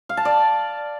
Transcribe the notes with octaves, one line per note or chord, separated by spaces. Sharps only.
F5
A5
D5